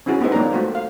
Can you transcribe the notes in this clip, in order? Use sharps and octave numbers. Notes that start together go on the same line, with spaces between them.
C4 C#4 E4 F#4 G#4
B3 D#4 G4 A4 C5 D#5
A#3 C4 C#5 D5 A#5
A3 F#4 C5
F5